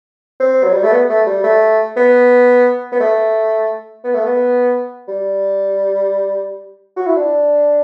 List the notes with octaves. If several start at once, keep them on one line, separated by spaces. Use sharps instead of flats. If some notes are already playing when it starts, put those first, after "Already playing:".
C4
F#3
G3
A3
B3
A3
G3
A3
B3
B3
A3
B3
A3
B3
G3
F#4
E4
D4